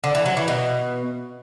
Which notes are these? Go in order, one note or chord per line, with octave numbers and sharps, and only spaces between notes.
D3
E3
F#3
E3
B2